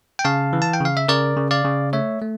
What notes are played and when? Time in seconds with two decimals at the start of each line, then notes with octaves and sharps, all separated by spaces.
0.19 G5
0.24 C#3 F5 A5
0.53 E3
0.62 A5
0.73 G5
0.81 C#3 F5
0.97 E5
1.08 C#3 A#4 D5
1.37 C#3
1.51 D5 F5
1.65 C#3
1.93 A3 C#5 E5
2.21 A3